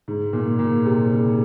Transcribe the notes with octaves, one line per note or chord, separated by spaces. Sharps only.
G#2
A#2
A#2
C3
C#3